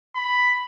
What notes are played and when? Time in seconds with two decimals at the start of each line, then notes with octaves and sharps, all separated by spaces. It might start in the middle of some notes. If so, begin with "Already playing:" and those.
0.16 B5